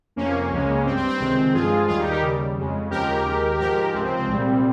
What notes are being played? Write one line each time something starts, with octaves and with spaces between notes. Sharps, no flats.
F2 C3 F3 A#3 C#4
C#2 C#3 G#3
G2 G3 C4
C4
C4
C#2 C3 D#3 G#3 C4
G2 F3 G#3 F4 G#4
D#2 D#3 G3 F4 G#4
D#4 G4
G4 A#4
D#2 C#3 G3
F2 C#3 G#3
D#2 C#3 F3 G#3 G4 A#4
D#2 D#3 G#3
G#2 F3 G#3 G4 A#4
C#2 C3 F3 G#3 C4
C4
C4
C2 A#2 G3